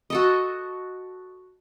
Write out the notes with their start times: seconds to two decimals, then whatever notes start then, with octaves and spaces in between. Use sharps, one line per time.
0.10 F#4 A4 D#5